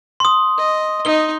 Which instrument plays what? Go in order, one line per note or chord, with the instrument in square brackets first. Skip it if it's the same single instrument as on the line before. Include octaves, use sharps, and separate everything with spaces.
[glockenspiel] C6 D#6
[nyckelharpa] D#5
[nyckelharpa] D#4 D#5 [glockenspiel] G7